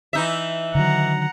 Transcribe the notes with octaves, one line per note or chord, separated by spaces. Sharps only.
E3 D#4 E5
D3 D#3 F#3 F#5 A#5